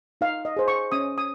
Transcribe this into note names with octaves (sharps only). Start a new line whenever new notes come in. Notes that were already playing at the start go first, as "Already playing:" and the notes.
D#4 F5
D#5
G#4 C5
C#6
C#4 D#6
D#6